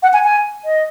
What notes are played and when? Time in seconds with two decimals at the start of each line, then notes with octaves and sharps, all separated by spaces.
0.03 F#5
0.13 G#5
0.24 G#5
0.65 D#5